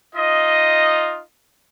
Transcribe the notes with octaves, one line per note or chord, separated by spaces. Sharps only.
D#4 F4 D#5